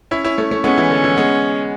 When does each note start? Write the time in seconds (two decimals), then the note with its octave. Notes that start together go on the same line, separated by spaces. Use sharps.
0.11 C#4 E4
0.24 C#4 E4
0.38 A3 C#4
0.51 A3 C#4
0.64 G#3 B3 C#4
0.78 E3
0.90 D3
1.04 E3
1.17 G#3 B3